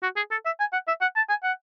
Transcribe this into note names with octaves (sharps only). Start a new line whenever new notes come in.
F#4
G#4
A4
E5
G#5
F#5
E5
F#5
A5
G#5
F#5